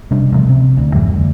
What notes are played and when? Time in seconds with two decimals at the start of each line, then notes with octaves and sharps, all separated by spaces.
0.11 C3 G3 D4
0.32 A1 C3 F3
0.49 C3 C4
0.77 D2
0.94 F2 G#2 E3 G3
1.16 D2